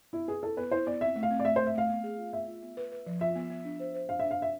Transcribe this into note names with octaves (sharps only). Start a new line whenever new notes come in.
B3 E4
G#4 B4
E4 A4
B3 B4
E4 C5
B3 D5
C4 E5
A3
F5
C4
D5
A3 E5
A3 C5
E5
A3 F5
B3
G#4
F4
B3 E5
F4
B3
B4
B4
F3
F4 E5
B3
B3
D4
C5
C5
D4 F5
D4 E5
F5
D4 E5